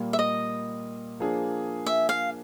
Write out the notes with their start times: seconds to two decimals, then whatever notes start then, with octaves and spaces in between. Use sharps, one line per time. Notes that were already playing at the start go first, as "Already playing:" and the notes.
Already playing: A#2 G3 A#3
0.13 E5
0.19 D#5
1.19 F3 A#3 D4 F4 G#4
1.86 E5
2.09 F5